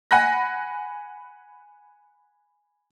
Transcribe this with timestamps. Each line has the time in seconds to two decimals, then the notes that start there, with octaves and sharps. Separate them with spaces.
0.11 F#5 G#5 B5 F#6 A#6